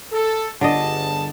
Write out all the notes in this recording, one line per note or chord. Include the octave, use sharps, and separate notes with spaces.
A4
G1 D3 G#4 D#5 A5